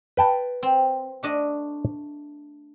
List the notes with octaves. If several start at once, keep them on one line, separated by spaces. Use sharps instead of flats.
B4 G5 A5
C4
A3 D4 D#5